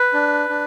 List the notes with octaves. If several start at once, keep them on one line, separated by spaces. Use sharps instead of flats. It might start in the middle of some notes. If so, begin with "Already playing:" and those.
Already playing: B4
D4
D4